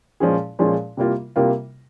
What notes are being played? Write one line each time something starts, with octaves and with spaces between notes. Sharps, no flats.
A#2 F3 G#3 C#4 G#4
A#2 F3 G#3 C#4 G#4
C3 G3 A#3 F4 A#4
C3 G3 A#3 F4 A#4